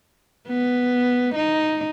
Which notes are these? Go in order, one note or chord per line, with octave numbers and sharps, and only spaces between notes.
B3
D#4